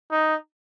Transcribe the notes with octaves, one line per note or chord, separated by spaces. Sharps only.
D#4